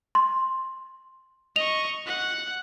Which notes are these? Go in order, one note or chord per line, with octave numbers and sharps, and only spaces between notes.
C6
D#5 C#6 F7
F#5